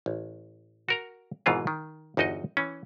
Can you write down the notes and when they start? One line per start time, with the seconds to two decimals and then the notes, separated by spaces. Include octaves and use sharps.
0.06 A1
0.89 F#4 A#4 A#5
1.46 G#1 G#2 B2 E3 F4 G#4
1.67 D#3
2.17 G1 E2 D#4 F#4 D#5
2.57 E3 C#4